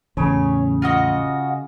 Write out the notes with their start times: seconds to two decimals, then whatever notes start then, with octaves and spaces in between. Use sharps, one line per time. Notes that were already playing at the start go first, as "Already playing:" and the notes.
0.17 A1 E2 C#3 C#5
0.82 F4 F#4 D#5